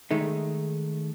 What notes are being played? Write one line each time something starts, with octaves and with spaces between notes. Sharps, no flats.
D#3 G#3 A3 D#4